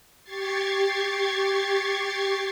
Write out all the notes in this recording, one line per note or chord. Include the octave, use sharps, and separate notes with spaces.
G4 C#6 G#6 A6 C7